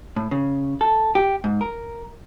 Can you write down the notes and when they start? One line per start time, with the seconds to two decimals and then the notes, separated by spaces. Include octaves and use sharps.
0.16 A2
0.31 C#3
0.81 A4
1.15 G4
1.44 G#2
1.61 A#4